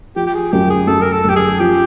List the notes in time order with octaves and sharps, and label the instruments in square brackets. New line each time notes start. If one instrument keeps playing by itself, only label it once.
[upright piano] F3 [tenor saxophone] G4
[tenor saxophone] G4
G#4
[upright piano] F#2 [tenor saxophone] G4
[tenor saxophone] G#4
[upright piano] F#2 [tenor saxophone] A4
[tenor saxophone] A#4
A4
[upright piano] F#2 [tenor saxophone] G4
[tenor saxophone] G#4
[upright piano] F3 [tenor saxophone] G4